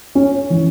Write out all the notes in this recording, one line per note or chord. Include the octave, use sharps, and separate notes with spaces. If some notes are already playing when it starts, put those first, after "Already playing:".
C#4
E3